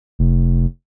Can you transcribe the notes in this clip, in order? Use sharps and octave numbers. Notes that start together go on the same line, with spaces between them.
F1